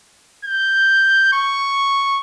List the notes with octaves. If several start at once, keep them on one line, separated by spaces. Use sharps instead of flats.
G6
C#6